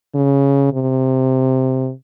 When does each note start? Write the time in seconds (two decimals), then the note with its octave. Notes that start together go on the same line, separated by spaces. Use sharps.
0.15 C#3
0.73 C3